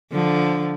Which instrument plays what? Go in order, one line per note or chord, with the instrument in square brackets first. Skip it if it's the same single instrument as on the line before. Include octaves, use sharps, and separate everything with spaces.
[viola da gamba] D3 F3